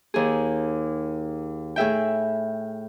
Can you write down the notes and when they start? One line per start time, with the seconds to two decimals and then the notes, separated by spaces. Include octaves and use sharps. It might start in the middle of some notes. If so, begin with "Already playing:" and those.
0.14 D#2 G#4
1.76 A2 G#4 E5 G5